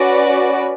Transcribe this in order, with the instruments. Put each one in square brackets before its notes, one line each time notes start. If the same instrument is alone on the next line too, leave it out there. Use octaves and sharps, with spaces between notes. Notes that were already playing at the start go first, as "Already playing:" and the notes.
Already playing: [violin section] C#4 F#4 B4 D5